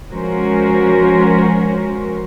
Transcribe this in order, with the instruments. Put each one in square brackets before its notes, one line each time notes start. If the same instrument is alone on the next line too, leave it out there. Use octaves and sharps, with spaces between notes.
[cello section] F3 G#3 C#4 F#4 A#4 C5